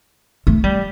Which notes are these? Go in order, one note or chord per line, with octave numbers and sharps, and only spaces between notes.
A3
G3